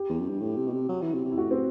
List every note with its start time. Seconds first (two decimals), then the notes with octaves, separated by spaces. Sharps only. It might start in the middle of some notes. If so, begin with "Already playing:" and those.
Already playing: G4
0.09 E2
0.20 F#2
0.30 G2
0.41 A2
0.57 C3
0.67 B2
0.73 C3
0.89 F#3
1.02 E3
1.14 C3
1.25 C3
1.31 E4
1.38 A2 F#4
1.51 C4